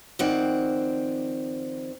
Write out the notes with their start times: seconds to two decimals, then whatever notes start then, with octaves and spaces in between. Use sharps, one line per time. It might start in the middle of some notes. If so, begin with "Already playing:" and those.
0.19 D#3 F3 C4 D5 F#5